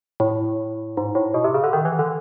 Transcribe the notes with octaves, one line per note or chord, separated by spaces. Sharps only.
A2
G#2
A2
B2
C3
C#3
D3
D#3
E3
D3